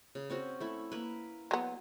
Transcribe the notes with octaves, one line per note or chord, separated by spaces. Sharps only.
C#3
C4 C#4 F#4
A3 E4
A#3 B4
F#3 B3